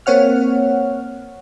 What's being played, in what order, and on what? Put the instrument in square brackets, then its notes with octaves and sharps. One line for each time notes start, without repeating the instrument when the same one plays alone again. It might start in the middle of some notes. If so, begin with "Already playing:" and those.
[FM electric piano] A#3 C4 C#5 F#5 F6